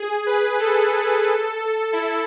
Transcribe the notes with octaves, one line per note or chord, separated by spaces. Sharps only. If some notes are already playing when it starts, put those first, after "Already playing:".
Already playing: G#4
B4
A4
E4